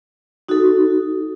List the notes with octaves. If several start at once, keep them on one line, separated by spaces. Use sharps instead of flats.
D#4 F#4 A4